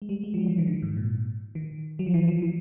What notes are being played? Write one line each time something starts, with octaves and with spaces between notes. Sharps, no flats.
G#3
G3
G#3
F3
F#3
E3
D#3
D3
G#2
A#2
D#3
F#3
F3
E3
F3
E3